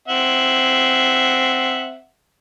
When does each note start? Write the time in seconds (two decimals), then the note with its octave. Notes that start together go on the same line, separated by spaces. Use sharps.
0.08 C4 E5 F#5